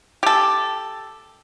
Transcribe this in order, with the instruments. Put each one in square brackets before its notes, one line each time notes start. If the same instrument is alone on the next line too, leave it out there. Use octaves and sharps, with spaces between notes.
[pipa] G4 A4